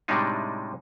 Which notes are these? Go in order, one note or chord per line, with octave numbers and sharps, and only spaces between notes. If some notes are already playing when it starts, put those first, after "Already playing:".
A2 C3 G3 G#3 D4 D#4